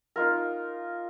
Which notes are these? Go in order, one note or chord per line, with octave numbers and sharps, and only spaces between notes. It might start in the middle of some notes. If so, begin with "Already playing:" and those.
D#4 F4 A#4